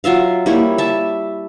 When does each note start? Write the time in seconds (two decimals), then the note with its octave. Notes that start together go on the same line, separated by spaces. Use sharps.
0.04 F#3 F4 E5 F5
0.46 G3 A#3 E4 C#5
0.78 E5 A5